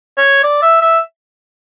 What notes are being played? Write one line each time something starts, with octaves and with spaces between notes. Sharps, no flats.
C#5
D5
E5
E5